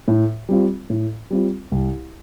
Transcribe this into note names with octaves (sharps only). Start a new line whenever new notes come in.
A2
G3 C4 F4
A2
G3 C4 F4
C2